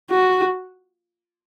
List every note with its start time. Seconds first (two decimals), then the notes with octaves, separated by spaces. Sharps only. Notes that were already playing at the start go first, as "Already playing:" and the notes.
0.11 F#4